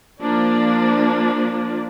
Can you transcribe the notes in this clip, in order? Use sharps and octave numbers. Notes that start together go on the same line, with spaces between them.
F3 A#3 D4